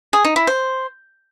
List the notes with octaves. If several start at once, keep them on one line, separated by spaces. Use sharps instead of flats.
G#4
D#4
E4
C5